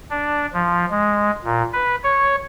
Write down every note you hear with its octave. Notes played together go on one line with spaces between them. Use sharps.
D4
F3
G#3
A#2
B4
C#5